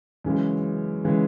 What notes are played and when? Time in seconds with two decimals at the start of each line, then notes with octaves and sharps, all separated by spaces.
0.24 F#2 C#3 E3 G#3
1.04 C#3 E3 G#3